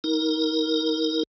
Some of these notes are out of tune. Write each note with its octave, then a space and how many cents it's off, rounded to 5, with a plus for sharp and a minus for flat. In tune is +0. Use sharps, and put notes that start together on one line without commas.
D#4 +30 A#4 +0